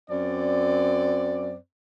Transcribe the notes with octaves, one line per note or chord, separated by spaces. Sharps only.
F#2 C4 D5